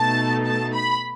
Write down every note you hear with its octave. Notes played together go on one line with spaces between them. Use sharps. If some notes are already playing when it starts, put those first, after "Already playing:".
Already playing: B2 A3 D#4 A5
A5
B5